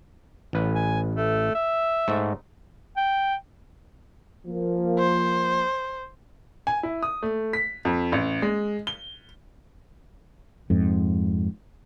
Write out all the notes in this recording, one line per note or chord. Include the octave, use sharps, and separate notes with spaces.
A1 B4
G#5
A3
E5
G#2 A3
G5
F3 A#3
C5
G#5
E4
D#6
A3
B6
F2
A1
G#3
G7
F2 G#2